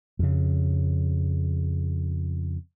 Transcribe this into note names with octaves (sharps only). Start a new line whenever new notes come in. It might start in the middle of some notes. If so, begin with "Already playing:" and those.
F2 C#3